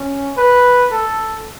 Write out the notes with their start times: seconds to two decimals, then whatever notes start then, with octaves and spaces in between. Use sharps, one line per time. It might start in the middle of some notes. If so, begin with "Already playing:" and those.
Already playing: C#4
0.37 B4
0.91 A4